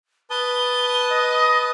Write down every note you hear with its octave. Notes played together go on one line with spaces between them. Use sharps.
B4 A5 D#6 G7
D#5